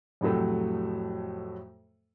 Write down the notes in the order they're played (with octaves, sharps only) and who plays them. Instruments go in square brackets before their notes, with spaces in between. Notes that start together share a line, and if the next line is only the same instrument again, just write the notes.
[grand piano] F2 A2 C3 F#3 A3